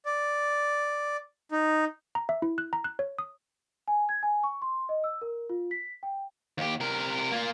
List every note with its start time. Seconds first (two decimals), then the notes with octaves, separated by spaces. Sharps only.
0.06 D5
1.51 D#4
2.15 A#5
2.29 E5
2.42 E4
2.58 F#6
2.73 A#5
2.84 F#6
2.99 C#5
3.19 D#6
3.88 G#5
4.09 G#6
4.23 G#5
4.43 C#6
4.62 C6
4.89 D#5
5.04 E6
5.22 A#4
5.49 F4
5.71 B6
6.03 G5
6.58 D#2 G4
6.80 C3 A#4
7.32 A#3 F4